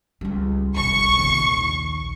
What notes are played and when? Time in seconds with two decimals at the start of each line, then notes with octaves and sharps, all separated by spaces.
0.21 C#2 G3
0.76 F1 C2 C#6
1.18 A#1 D#2